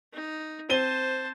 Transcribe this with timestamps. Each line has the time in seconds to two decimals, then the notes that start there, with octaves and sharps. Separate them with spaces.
0.13 D#4
0.69 C4 C5 A5 D#7 G7